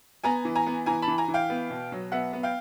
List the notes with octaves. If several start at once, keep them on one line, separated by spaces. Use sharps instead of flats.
B3 G#5 A#5
E3
G#5 A#5
B3
E3 G#5 A#5
A5 B5
E3
G#5 A#5
E3
F5 G5
B3
B2
F#3
B3 E5 F#5
B3
F5 G5